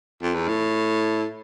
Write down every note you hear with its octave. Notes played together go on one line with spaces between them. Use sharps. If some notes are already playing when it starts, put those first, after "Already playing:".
F2
E2
A2